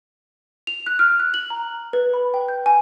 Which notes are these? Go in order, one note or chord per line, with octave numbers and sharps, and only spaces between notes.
F7
F#6
F6
F#6
F#7
A#5
B4
B5
G5
G6
G#5